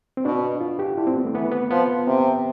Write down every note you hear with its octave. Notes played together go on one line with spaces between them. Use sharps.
C4
B2 D4
F4
G4
D3 E4
C4
B3
A3
E3 B3
B3
F3 B3
C3 C4